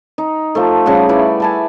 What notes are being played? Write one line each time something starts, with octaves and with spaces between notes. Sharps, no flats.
D#4
F3 A3
C#3 G3 A3 F#5
E4 B4 D5 E5
G#5 A5 B5